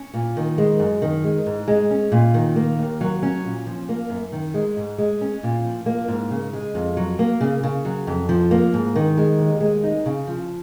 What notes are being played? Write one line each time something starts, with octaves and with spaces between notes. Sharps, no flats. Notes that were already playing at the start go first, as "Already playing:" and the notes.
Already playing: C#4
A#2
D#3
G#3
F#2
D#3
G#3
G#2
G#3
C#4
A#2
D#3
A#3
D#2
F#3
C#4
A#2
F3
A#3
F#2
D#3
G#3
G#2
G#3
C#4
A#2
F3
A#3
G#2
C#3
G#3
F2
F#3
A#3
C#3
C#3
F#3
F2
F3
A#3
G#2
D#3
G#3
D#2
G#3
D#4
C#3
F3